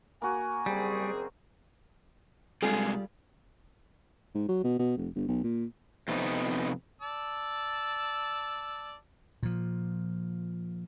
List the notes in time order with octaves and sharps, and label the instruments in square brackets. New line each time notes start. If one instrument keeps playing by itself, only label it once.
[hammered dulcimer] A#3 F#4 [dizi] G#5
[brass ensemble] F#1 C4 G#4 [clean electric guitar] G3
[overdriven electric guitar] C3 G#3 [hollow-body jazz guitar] G3 F4 [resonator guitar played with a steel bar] G#4
[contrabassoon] G#2
F#3
B2
B2
F1
G1
B1
A#2
[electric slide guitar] F2 C3 B3 D#4
[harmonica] D5 A5 E6
[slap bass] A#2 F3